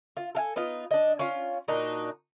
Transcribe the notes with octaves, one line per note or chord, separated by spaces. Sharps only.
F4
A4 F5 G#5
B3 D#4 F4
D4 D#5
C#4 F4
A#2 D4 D#4 F#4